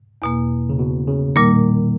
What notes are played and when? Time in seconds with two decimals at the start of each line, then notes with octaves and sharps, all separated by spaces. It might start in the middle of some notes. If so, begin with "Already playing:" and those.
0.22 E2 B2 A#3
0.69 C#3
0.79 B2
1.08 C#3
1.36 A#2 D#3 G3 A#3